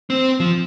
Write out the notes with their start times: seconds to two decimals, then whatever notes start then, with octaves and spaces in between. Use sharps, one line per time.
0.10 C4
0.40 F3